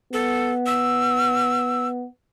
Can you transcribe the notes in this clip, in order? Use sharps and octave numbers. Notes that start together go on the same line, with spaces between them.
B3 A4
E6